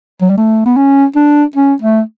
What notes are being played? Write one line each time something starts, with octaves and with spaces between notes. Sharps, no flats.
F#3
G3
A3
B3
C#4
D4
C#4
A3